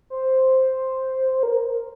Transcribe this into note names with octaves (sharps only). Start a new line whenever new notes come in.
C5
A#4